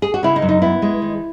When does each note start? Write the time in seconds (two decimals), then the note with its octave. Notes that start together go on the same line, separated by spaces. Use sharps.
0.02 G#4
0.14 F#4
0.23 C#3 E4
0.36 D#4
0.42 F#2
0.49 D#4
0.62 B3 E4
0.82 G#3
1.02 D#3